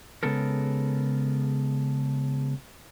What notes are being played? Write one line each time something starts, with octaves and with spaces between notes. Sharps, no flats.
C#3 G#3 B3 A4 A#4